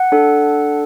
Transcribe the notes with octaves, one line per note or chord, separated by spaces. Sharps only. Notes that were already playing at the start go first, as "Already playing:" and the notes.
Already playing: F#5
D4 A4